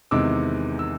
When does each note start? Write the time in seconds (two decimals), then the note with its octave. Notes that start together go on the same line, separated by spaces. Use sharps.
0.11 E2 C3 D#3 G#3 D6 E6
0.79 E6